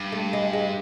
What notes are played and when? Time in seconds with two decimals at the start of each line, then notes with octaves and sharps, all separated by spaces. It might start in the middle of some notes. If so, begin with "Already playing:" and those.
Already playing: G2
0.12 A3
0.33 G#3
0.53 G#3